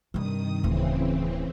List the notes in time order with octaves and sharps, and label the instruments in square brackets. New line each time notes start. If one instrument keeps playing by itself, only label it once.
[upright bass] G2 C3 [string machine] D#3 D#6
[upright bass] D1 [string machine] C#3 E3 C4